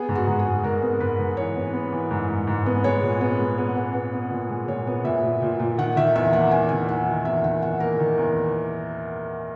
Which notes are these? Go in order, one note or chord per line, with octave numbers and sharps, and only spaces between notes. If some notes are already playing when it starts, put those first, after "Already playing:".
Already playing: B3 G#4
G#2
F#4
G#2
G#4
G#2
G#2 A#4
B3
G#2 B4
G#2
E3 C#5
B3
B3
E3
G#2
G#2
G#2
B3
G#3 C#5
A#2
B3
G#3
B3
B3
B3
B3
A#2
G#3
A#2 C#5
B3
A#2 E5
A#2
A#2
A#2
D#3 F#5
D#3 E5
E2 E5
A#3 F#5
E2 G#5
D#3 G#5
D#3 F#5
D#3
E2 E5
D#3 F#5
E2 F#5
A#3 A#4
D#3
E2